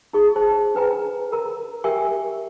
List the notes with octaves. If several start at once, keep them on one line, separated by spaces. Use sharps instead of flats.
D#4 G#4 C#6
C5 A5
D4 B4 G5 A#5
A#4 A#5
G4 A#4 E5 G5 G#5 C#6